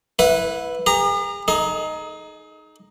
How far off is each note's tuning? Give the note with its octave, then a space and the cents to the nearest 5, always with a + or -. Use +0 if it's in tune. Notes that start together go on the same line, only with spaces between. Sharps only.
E4 +0 B4 +0 F#5 -45
G#4 -45 A#5 +0
D#4 +0 G#4 +35